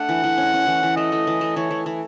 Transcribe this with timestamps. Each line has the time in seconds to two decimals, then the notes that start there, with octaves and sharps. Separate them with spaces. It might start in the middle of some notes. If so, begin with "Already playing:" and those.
Already playing: A3 D4 F#5
0.09 E3
0.24 E3
0.38 C#4
0.54 C#4
0.67 E3
0.83 E3
0.97 A3 D#5
1.12 A3
1.27 E3
1.41 A3
1.56 E3 C#5
1.71 E3
1.86 E3